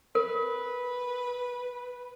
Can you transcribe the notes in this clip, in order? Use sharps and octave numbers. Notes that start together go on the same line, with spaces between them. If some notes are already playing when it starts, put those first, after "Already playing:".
A#4 B4